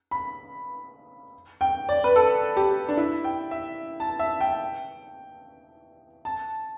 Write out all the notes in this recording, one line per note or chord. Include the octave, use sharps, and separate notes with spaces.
B5
G5
D5
B4
A4
G4
D4
E4
G5
E5
A5
E5
G5
A5